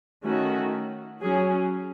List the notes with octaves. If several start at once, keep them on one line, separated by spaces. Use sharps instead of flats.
D#3 A3 C#4 F#4
F#3 C#4 G#4